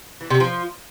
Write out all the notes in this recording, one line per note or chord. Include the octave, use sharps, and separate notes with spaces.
E3
C3
F3